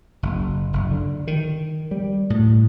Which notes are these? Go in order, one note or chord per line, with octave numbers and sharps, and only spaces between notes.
F#1
F#1
D3
D#3
G3
A2